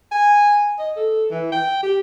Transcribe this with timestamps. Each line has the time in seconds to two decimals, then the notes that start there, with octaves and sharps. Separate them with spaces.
0.11 G#5
0.79 D#5
0.96 A4
1.31 E3
1.52 G5
1.83 G4